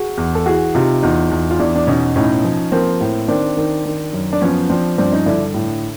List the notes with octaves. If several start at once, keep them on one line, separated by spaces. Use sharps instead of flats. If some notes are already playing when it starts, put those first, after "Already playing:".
Already playing: F#4 G#4
E2
A4
E3 F#4 G#4
C3 D#4 F4
E2 D#4 F4
E2
F4
E2 D4 E4
D4
B2 C#4 D#4
A2 C#4 D#4
F3
F3 A#3 C4
A2
D#3 C4 D4
D#3
D#3
F#2
D4
F3 B3 C#4
F3 C4 D4
G2 C4 D4
C#4 D#4
D3 D4 E4
A2